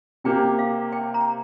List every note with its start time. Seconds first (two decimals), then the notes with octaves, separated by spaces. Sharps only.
0.24 C3 A#3 G4 G5
0.59 F5
0.92 G5
1.14 A#5